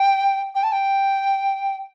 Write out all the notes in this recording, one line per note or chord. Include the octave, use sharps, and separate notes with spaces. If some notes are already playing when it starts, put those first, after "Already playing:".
Already playing: G5
G5
A5
G5